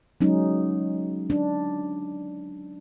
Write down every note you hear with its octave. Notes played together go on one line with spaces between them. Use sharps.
F#3 G#3 C#4 D#4
D4